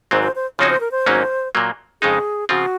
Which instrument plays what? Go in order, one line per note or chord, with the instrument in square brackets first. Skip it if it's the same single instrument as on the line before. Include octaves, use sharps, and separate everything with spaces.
[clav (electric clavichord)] G#1 G#2 F#3 C4 [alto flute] C5
[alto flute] C5
C5
[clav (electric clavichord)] C#3 F3 C4 D#4 F#4 [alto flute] C#5
[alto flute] C5
A#4
C5
[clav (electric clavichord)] G#1 G#2 F#3 A#3 C#4
A#2 F#3 A#3
[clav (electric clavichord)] F2 C#3 G#3 D#4 [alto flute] G#4
[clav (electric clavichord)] C#3 F3 C4 F4 [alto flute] F#4